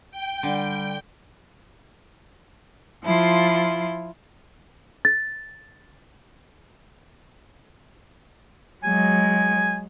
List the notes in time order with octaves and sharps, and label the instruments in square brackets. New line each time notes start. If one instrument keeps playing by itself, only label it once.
[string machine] G5
[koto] D3 [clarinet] G3
[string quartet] F3 E4 F4
[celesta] A6
[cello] F#3 G#3 [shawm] G#5